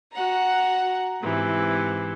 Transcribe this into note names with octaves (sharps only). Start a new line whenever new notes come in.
F#4 F#5 A#5
G#2 C3 E3